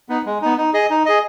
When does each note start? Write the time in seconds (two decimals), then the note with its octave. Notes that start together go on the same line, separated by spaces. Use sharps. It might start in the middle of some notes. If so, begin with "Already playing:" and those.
0.09 B3 D#4
0.26 G#3
0.42 B3 D#4
0.58 D#4
0.74 G#4 D#5
0.90 D#4
1.06 G#4 D#5